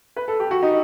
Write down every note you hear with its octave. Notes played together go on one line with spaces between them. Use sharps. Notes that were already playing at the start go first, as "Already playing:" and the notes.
B4
A4
G4
F#4
D#4